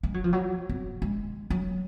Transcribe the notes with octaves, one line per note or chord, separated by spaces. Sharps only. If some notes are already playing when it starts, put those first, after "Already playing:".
G#3
F#3
F3
F#3
C4
G#3
F#3